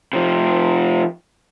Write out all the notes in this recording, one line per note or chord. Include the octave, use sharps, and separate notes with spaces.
C3 F3